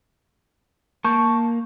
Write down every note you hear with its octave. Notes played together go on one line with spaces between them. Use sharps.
A#3 A5 C#6 G6